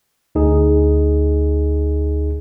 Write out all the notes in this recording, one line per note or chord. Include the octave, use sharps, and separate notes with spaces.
D2 D#4 G#4